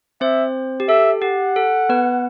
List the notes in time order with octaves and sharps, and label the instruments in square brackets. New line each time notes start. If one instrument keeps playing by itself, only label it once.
[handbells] C4 C5 [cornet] E5
[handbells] G4
[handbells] A4 [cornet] E5
[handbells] G4 [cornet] F#5
[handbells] A4
B3 B4